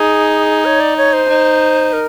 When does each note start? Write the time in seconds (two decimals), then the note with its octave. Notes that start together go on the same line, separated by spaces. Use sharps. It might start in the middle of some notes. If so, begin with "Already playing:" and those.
Already playing: D#4 G#4
0.65 C#5
0.80 D5
0.97 C#5
1.13 C5
1.29 D#4
1.93 A#4